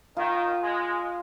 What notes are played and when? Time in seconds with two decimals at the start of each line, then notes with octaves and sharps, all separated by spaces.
0.17 D#3 F4
0.61 G#3